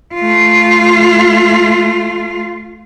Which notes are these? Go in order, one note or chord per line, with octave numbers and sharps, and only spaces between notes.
A3 F4